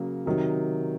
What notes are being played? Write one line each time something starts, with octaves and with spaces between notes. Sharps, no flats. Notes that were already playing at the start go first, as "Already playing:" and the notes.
Already playing: C#3 F#3 A#3
C3 D#3 F#3